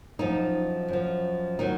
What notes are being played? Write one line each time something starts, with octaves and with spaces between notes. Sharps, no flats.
F#2 F3 D#4
F#2 F3
D#3 F#3 D#4